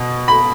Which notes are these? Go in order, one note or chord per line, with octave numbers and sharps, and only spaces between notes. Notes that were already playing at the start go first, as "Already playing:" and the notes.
Already playing: B2
B5